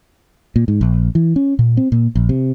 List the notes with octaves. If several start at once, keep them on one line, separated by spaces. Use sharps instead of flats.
A#2
G#2
A#1
E3
C#4
A#2
C4
A#2
A#1
C3